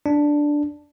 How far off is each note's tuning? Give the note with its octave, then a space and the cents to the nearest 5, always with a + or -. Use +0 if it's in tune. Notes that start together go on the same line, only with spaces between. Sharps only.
D4 +0